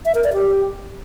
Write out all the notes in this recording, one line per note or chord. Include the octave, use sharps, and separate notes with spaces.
E5
A#4
D5
G4